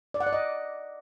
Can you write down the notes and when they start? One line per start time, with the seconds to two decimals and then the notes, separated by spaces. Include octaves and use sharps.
0.14 D5
0.20 F#5
0.27 D5
0.33 D#5